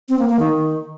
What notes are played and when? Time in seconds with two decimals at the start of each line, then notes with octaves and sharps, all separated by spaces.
0.09 C4
0.19 A#3
0.29 A#3
0.39 D#3